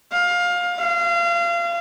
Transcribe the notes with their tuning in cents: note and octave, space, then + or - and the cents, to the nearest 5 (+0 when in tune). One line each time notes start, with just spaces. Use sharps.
F5 +20
F5 -30